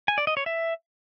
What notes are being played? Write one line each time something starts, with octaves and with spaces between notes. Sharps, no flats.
G#5
D5
D#5
C#5
E5